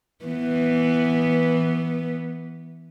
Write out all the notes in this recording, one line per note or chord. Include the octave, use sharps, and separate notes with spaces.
E3 B3